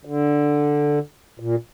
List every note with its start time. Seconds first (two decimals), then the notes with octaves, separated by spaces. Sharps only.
0.05 D3
1.40 A#2